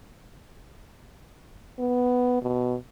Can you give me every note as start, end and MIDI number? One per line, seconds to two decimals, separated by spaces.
1.79 2.40 59
2.42 2.75 47